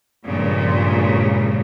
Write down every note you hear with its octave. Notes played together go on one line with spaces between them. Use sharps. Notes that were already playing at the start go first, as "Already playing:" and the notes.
G2 A#2 C#3 F3 G#3